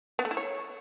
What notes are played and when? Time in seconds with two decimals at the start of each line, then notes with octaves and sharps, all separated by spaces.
0.19 B3
0.25 A3
0.31 E4
0.37 C#5